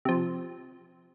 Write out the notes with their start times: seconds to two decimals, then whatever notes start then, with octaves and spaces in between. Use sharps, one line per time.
0.05 C3 F3